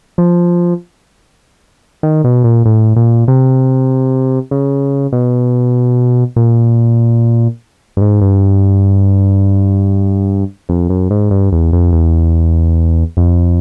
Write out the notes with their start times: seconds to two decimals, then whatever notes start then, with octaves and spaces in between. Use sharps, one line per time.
0.18 F3
2.03 D#3
2.24 B2
2.44 A#2
2.66 A2
2.96 A#2
3.28 C3
4.51 C#3
5.13 B2
6.36 A#2
7.97 G2
8.01 G#2
8.21 G2
10.69 F2
10.89 F#2
11.11 G#2
11.31 G2
11.52 E2
11.73 F2
11.93 E2
13.17 F2